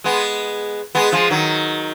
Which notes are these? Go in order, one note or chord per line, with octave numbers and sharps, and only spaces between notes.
G#3 B3
G#3 B3
F3 G#3
D#3 F#3